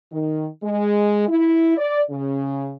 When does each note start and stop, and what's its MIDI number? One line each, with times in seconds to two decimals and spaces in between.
0.12 0.46 51
0.63 1.27 56
1.27 1.76 64
1.78 2.01 74
2.10 2.73 49